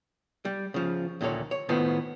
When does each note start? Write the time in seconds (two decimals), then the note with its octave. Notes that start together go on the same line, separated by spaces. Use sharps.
0.45 G3
0.74 C#3 F3
1.21 D2 A#2 D#3 A4 C#5
1.51 C#5
1.69 A2 D#3 B3 F4 C5 A5